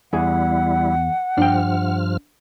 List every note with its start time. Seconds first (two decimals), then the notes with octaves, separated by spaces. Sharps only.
0.13 E2 G3 E4 G#4 F#5
1.38 G2 F3 D4 G5 F6